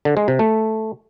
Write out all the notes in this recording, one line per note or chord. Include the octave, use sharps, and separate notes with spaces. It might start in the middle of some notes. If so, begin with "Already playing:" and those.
D3
G#3
C3
A3